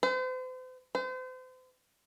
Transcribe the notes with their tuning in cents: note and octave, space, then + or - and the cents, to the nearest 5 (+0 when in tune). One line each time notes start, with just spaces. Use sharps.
C5 -40
C5 -40